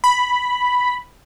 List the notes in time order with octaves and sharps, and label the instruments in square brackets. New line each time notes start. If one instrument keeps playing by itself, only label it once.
[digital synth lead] B5